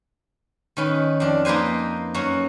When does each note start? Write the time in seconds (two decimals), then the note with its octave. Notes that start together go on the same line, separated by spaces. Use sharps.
0.77 D#3 C#4 B4
1.20 F2 D4
1.45 A#3 D#4 B4 C5 G#5
2.14 F#2 F#4 C#5